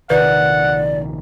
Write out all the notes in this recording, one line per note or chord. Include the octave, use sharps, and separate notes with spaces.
A#1 C3 D#3 B4 D5 F#5